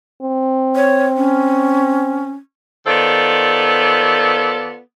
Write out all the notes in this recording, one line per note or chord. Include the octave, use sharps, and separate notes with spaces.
C4
C#5
C#4
D#3 B3 F4 A4 C5 D5